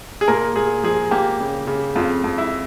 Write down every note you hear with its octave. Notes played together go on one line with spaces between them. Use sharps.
G#4
A#2 A#4
A#2 G#4
F3 G#4
A#3 G4
C#3
C#3
F2 F4
F2
E4